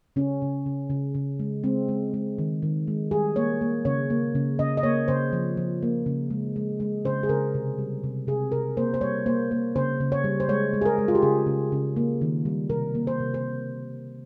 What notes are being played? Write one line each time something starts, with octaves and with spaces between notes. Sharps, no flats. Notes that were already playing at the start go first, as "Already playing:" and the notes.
C#3 C#4
C#3
C#3
C#3
C#3
G#3
G#3 C4
G#3
G#3
D#3
D#3
G#3
G3 G#4
A#3 C#5
A#3
C#3 C#5
A#3
C#3
C#3 D#5
D#5
A#3 C#5
C#3 C5
F3
F3
A#3
C#3
G#3
G#3
G#3
C#3 C5
G#4
C#3 A#4
C3
G3
C3
C3 G#4
C3 A#4
A#3 C5
C5
G3 C#5
A#3 C5
A#3
C#3 C5
C#3
C#5
G3
C5
G#3 C#5
G#3
G#4
A#4
G#3
F4
G4
C#3 G#4
C#3
C#3
A#3
D#3
G3
C3 A#4
A#3
C5
C3
C5